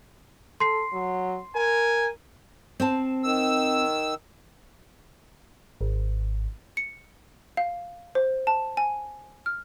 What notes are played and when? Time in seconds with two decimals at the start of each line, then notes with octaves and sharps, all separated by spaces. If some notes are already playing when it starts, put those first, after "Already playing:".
0.60 A4 C6 C7
0.93 F#3
1.55 A#4 G#5
2.80 C4 C5 A5
3.24 D#3 E6
5.81 G#1
6.77 C#7
7.57 F5
8.15 C5
8.47 A5
8.77 G#5
9.46 F6